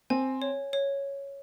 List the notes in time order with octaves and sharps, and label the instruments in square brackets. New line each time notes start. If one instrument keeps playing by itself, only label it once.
[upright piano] C4 [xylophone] G#5
[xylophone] C#5
C#5